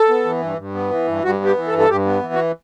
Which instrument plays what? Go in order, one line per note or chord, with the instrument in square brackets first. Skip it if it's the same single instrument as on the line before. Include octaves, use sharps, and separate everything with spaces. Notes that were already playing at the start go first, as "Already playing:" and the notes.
Already playing: [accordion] A4
B3
E3
G2
G2
B3
E3
G2
G2 F#4
B3 G4
E3
A4
G2
A4
G2 G4
B3
E3
F#4